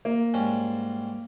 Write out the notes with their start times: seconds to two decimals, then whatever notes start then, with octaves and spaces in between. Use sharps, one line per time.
0.05 A#3
0.34 G#2 G3 C#4